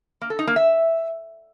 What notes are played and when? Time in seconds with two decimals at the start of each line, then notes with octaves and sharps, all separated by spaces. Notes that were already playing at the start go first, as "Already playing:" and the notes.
0.21 A#3
0.30 A4
0.39 D#4
0.47 A#3
0.56 E5